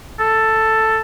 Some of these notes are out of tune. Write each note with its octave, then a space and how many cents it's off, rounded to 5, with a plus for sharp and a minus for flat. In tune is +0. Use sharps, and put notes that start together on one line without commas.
A4 +5